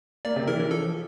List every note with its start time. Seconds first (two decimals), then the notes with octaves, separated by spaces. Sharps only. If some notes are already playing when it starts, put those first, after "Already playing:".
0.25 A#3 D5
0.36 C3
0.48 E3 A#4
0.60 E3
0.71 F3 A4